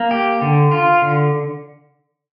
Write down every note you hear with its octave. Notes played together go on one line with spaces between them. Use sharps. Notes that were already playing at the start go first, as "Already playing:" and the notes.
Already playing: A#3
G4
D3
F4
D3